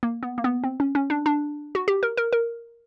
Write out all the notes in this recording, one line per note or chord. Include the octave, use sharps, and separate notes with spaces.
A#3
B3
A#3
B3
C4
C#4
C#4
D4
D4
F#4
G4
A#4
A#4
A#4